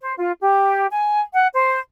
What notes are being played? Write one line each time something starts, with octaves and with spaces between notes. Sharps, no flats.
C5
F4
G4
G#5
F#5
C5